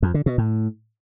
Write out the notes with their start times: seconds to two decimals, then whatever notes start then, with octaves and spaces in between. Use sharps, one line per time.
0.03 F2
0.14 D3
0.26 B2
0.38 A2